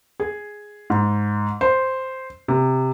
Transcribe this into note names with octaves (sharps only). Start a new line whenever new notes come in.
G#4
G#2
C5
C3